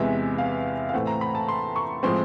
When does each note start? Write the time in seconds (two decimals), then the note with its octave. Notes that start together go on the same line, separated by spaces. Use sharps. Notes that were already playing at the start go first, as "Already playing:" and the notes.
Already playing: E2 C3 E3 G#3 B3 E5
0.38 F5
0.89 F5
0.93 A2 E3 A3 C4 F#5
1.07 A#5
1.21 B5
1.35 A5
1.49 C6
1.76 C#6
2.03 A2 F3 G#3 C4 C6